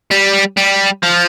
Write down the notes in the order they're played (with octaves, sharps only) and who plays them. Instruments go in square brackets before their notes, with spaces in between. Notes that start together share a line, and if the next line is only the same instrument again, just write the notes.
[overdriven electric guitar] G3
G3
F3